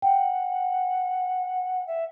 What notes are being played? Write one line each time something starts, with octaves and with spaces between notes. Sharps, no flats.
F#5 G5
E5